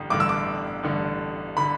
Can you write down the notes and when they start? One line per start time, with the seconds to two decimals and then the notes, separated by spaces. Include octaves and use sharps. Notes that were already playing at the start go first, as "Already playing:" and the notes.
Already playing: A1 G2 D3
0.10 A1 G2 D3 D6
0.20 E6
0.29 D6
0.83 A1 G2 D3
1.57 D3 B5